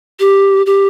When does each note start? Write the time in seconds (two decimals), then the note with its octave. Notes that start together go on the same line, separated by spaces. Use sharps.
0.20 G4
0.66 G4